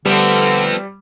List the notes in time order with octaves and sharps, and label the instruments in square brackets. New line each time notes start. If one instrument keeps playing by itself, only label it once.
[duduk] D3 [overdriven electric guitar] F3 C4 [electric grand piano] G3 [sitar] A3 B3